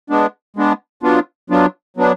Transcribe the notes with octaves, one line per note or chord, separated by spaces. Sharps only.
G#3 B3 D4
G#3 B3 D4
F#3 B3 D4 F4
F#3 B3 D4 F4
F#3 B3 D4